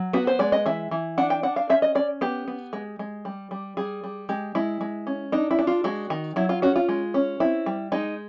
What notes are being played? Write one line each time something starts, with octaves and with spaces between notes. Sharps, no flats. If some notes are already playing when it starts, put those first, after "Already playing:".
Already playing: F#3
B3 F#4
C5
G#3 D5
D#5
E3 E5
E3
D4 F#5
G5
D4 F#5
F5
C#4 E5
D#5
C#4 D5
B3 G4
B3
G#3
G#3
G3
G3
G3 G#4
G3
G#3 G4
G#3 E4
G#3
C#4
D4 D#4
E4
D4
F4
G#3 F#4
D#3
F#3 E4
F4
C#4 F#4
F4
G#3
C#4
C4 E4
G3
G#3 D#4